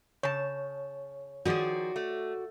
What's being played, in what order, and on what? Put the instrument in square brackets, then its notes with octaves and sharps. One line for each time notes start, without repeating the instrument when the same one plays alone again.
[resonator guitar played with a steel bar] C#3 A5 [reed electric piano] C#5
[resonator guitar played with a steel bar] D#3 F3 G#4 [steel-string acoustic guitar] F#4 D5
[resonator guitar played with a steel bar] A3